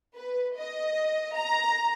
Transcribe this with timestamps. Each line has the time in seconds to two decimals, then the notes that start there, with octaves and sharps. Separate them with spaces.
0.15 B4
0.56 D#5
1.35 A#5